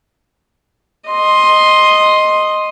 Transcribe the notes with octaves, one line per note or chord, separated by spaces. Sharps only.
D#5 C6